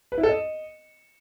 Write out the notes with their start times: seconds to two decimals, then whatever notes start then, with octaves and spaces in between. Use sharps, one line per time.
0.12 B4
0.18 E4
0.23 A4
0.29 D#5